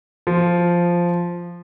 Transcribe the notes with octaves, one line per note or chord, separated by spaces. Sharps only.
F3